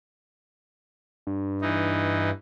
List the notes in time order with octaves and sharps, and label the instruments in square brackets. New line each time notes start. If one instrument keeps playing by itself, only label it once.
[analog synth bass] G2
[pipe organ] E3 D#4